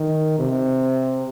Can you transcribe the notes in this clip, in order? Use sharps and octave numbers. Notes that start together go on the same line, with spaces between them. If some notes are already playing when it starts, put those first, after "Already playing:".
Already playing: D#3
C3